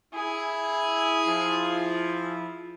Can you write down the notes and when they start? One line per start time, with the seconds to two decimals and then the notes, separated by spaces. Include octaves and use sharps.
0.14 E4 G#4
1.28 F3 E4 F4